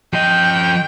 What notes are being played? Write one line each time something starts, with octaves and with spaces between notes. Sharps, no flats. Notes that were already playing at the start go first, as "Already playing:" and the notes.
F3 D#5 G5